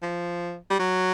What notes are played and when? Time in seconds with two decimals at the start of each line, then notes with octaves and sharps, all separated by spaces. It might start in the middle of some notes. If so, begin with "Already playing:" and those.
0.02 F3
0.70 G3
0.79 F#3